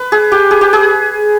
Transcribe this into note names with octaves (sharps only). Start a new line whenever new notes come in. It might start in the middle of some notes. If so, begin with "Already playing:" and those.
Already playing: B4
G#4
G4
G#4
G4
G#4